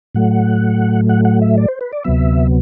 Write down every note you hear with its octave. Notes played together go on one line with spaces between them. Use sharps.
A2 F#3 A3 F#5
F#5
F#5
E5
D5
C5
B4
D5
D2 C3 F#3 B3 E5